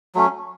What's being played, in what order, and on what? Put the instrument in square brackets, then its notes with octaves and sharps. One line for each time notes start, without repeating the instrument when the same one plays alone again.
[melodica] F#3 A3 C#4